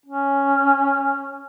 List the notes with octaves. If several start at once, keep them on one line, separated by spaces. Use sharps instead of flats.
C#4